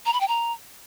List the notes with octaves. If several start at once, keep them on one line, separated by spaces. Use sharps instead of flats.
A#5
B5
G5
A#5